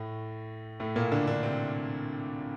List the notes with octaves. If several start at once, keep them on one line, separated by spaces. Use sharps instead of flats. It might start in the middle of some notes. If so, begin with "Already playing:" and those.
Already playing: A2 A3
A2 A3
A#2 A#3
D3 D4
D3 D4
C3 C4